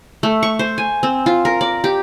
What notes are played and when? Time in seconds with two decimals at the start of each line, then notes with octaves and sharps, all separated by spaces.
0.23 A3
0.43 C#6
0.59 C5
0.78 G#5
1.03 C4
1.26 F4
1.45 A#4
1.61 D5
1.84 G4